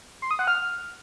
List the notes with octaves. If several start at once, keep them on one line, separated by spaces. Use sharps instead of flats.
C6
D#6
F#5
F6